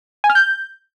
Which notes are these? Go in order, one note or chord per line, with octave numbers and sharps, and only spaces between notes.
G#5
F6
G6